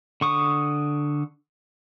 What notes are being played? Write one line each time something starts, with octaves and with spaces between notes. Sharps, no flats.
D3 C#6 D#6